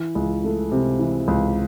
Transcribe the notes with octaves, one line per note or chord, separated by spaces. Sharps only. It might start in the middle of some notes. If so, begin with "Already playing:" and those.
Already playing: E3
C#2
A3
C3
E3
C#2